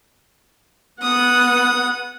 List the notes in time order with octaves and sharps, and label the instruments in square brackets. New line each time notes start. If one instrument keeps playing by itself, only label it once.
[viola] B3 F#5 [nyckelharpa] D#6